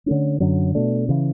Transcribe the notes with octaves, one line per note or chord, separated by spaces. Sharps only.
D3 A3 C#4
F#2 D3 F#3 C#4
B2 A3 D4
C#3 E3